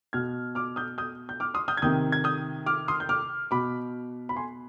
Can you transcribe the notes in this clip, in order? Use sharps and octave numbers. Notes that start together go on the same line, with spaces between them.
B2 F6 G#6
D6 F6
D#6 G6
D#6 G6
G6
D6 F6
C6 D#6
D#6 G6
G#6
C3 D#3 D#6 G6
G#6
D#6 G6
D6 F6
C6 D#6
G6
D6 F6
B2 B5 D6
B5
G#5 C6